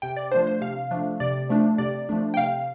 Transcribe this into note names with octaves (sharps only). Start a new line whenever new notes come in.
C3 G5
D5
F3 A3 D4 C5
C5
C3 F5
F3 A3 D4
C3 D5
F3 A3 D4
C3 D5
F3 A3 D4
G5
C3 F5